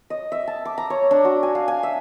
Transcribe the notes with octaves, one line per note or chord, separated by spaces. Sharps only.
D#5
E5
A5
D6
A#5
C#5
D4
F#4
G#5
F5
G#5
E5